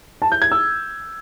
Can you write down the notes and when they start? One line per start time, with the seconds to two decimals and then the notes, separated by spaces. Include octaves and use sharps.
0.22 A5
0.32 G6
0.42 G#6
0.52 E6